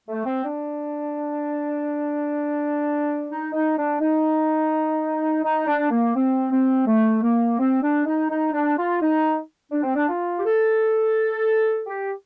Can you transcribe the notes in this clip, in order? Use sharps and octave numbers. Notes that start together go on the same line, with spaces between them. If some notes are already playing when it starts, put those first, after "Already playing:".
A3
C4
D4
D#4
D#4
D4
D#4
D#4
D4
A#3
C4
C4
A3
A#3
C4
D4
D#4
D#4
D4
F4
D#4
D4
C4
D4
F4
G4
A4
G4